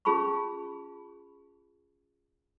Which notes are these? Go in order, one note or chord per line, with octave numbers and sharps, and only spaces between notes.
C#4 F4 G#4 A5 B5 C#6